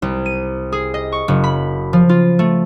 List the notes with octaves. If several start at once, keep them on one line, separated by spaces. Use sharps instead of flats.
C2
D#7
G#4
D#5
C#6
F#1
B5
F3
F4
A3